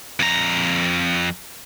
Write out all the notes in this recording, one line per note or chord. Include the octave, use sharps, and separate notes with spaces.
F2 A#5